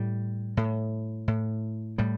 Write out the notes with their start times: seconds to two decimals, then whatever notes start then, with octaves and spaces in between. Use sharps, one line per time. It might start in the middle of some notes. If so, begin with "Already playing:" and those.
Already playing: A2 G3
0.57 A2
1.28 A2
1.98 A2 G3